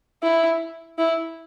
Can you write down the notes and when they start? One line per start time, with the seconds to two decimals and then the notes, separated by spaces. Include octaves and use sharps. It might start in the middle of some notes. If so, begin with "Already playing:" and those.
0.23 E4
0.98 E4